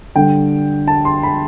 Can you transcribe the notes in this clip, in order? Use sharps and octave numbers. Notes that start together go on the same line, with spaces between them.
D3 G3 D4 G5
A5
C6
B5